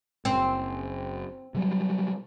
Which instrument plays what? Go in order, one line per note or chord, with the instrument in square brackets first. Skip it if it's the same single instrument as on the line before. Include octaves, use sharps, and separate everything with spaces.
[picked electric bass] F#1 [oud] C4
[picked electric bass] C3 F#3 G3